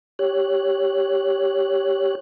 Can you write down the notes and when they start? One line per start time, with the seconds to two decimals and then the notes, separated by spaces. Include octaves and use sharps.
0.19 G4 C#5 F#6